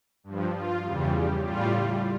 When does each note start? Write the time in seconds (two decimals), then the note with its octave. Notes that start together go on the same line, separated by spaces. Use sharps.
0.24 G2
0.29 F3
0.54 F4
0.85 E2 C#3 G3
1.16 G4
1.45 A2 G3 F4